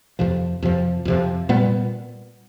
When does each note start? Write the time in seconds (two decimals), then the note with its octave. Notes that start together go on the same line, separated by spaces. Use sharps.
0.19 F2 C3 F3
0.63 F2 C3 F3
1.05 F2 C3 F3
1.49 A#2 G3 B3